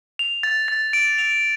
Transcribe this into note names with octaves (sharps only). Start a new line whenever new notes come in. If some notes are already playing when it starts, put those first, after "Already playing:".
F7
A6
A6
D7
F7